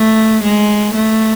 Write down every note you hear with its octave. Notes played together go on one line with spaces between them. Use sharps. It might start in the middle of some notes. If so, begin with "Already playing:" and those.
Already playing: A3
G#3
A3